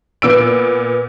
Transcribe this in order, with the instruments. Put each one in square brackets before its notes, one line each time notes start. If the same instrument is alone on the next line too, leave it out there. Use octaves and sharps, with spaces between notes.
[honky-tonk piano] A#2 B3 E6 D7